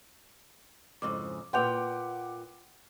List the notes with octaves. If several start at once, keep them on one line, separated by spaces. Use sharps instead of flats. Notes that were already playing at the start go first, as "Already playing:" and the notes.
F2 G#2 C#3 D6
A#2 B4 F#5 G5 C6 D6 G6 F7